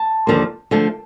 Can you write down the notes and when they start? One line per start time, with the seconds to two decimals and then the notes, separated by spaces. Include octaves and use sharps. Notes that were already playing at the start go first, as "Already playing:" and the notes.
Already playing: A5
0.27 D#2 D3 F3 A#3
0.71 D3 F3 A3 D4